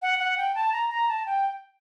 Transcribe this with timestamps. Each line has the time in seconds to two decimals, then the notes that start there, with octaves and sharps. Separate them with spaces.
0.02 F#5
0.19 F#5
0.37 G5
0.55 A5
0.73 A#5
0.90 A#5
1.09 A5
1.26 G5